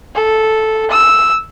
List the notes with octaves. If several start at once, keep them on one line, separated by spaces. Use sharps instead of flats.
A4
E6